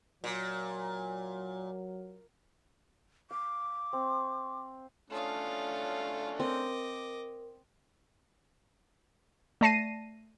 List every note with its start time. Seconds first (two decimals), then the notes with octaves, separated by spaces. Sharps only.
0.24 A#2 F#3
3.31 F5 D6
3.93 C4
5.10 A3 C#4 D4 F4 C#5 F5 A5 D#6
6.40 C4 A#4 D#5 D6
9.61 A3 D5 A5 A#6 C7 D#7